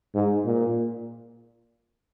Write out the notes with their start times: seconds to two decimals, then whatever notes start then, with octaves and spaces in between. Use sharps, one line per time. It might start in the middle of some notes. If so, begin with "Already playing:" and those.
0.15 G#2
0.45 A#2